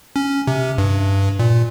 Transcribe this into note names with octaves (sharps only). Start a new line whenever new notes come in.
C#4
C3
G2
A#2